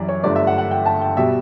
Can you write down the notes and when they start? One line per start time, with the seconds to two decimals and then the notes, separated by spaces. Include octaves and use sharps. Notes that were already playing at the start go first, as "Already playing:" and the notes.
Already playing: F#2 E3 G3 D5
0.09 C#5
0.23 G1 G2 D3 A3 D5
0.36 E5
0.47 F#5
0.58 F#5
0.71 G5
0.86 A5
1.02 G5
1.17 B2 G3 E5